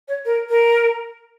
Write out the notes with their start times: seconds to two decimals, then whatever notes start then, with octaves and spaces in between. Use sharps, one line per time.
0.08 C#5
0.25 A#4
0.49 A#4